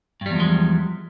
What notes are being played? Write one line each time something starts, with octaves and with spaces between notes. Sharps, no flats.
E2 G2 F3 G3 G#3